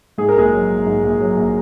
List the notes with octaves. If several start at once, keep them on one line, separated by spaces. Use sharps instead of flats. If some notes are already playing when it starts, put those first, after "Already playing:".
G#2 G#4
A#4
A#1 G#3 G#4
F#3
A#1
G#2
A#1
F#3
A#1